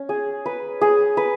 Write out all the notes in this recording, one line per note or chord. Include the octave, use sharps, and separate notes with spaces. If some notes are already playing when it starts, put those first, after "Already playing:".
Already playing: C#4
G#4
B4
G#4
B4